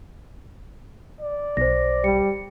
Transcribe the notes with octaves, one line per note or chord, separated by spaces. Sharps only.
D5
B1 C5 A#6
G3 C#7